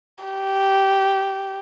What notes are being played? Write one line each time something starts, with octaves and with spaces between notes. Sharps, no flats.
G4